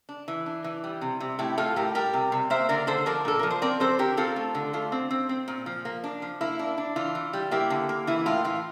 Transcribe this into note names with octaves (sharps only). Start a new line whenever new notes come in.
D4
E3
D4
E3
G3
C3
C3
A2 E4 G4
A2 F4 A4
A2 G4 A#4
G3 G4 A#4
C3
C3
A#3 C5 E5
D3 A#4 D5
D3 A4 C5
F3 A#4 D5
A#2 A4
F3 A#4
C5
C4 A#4 D5
C4 A4 C5
D3 G4 A#4
C4 F4 A4
A3
D3
A3 F4
C4
C4
C4
A#2
F3
A#3
D4
F3
A#3 E4
D4
D4
E3 F4
E3
G3
A#3 E4 G4
D3
A#3
E3 E4
A2 F4
E3 F4